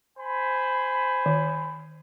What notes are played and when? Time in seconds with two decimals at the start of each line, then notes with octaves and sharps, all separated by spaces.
0.18 C5 G#5 B5
1.26 D#3